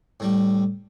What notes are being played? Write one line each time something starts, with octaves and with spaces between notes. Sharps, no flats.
A2 G3